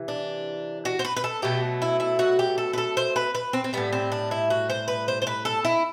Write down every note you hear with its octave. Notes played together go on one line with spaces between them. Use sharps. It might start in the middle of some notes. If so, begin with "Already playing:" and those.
Already playing: C3 E3
D4
F#4
C5
B4
B4
A4
B2 F#3 A3 G4
E4
E4
F#4
G4
A4
B4
A4
C5
B4
B4
C4
C4
A2 G3 B3
C4
D4
E4
F#4
C5
B4
C5
C5
B4
A4
E4